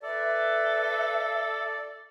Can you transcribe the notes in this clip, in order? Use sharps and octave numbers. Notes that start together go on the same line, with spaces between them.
A4 B4 D5 E5